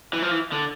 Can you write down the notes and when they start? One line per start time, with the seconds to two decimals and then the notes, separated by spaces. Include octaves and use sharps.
0.13 E3
0.22 F3
0.31 E3
0.52 D3